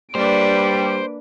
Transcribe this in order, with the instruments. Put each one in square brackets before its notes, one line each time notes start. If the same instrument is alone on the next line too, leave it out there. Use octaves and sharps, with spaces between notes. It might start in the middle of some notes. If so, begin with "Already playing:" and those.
[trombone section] G3 [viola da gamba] A#3 D4 B4 [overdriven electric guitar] C5 [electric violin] D7